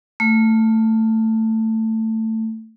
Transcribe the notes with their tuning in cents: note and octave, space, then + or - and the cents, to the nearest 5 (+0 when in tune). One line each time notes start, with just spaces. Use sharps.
A3 +15